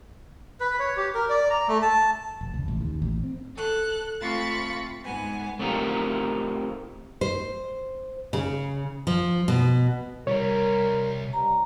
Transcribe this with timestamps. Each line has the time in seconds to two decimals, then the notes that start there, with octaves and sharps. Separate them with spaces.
0.60 B4
0.79 C#5
0.97 G4
1.15 A#4
1.29 D5
1.50 A#5
1.68 A3
1.82 A5
2.41 F1
2.54 C#2
2.68 A1
2.81 D#2
3.02 A1
3.24 C4
3.55 A4 F#6
4.20 A3 C4 F4 B5 C#6 A6
5.03 G#2 B3 G#5
5.59 A3 C4 D#4 F4 G4 A#4
7.21 C5
8.33 C#3
9.07 F3
9.48 B2
10.27 C2 G3 A#4 C#5
11.33 G2 A#5